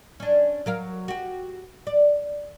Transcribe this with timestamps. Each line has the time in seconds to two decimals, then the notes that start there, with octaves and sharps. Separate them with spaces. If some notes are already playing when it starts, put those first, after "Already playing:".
0.20 C#4 D4
0.66 F#3 A#4 F5
1.08 F#4 G4
1.87 D5